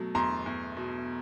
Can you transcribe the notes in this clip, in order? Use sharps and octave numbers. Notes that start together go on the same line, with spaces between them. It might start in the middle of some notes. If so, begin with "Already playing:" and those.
Already playing: B2 F#3 A3
E2 A#5 C6
E2
B2